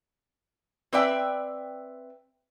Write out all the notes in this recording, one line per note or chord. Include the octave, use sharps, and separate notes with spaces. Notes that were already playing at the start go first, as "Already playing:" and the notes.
C4 B4 D5 E5 G5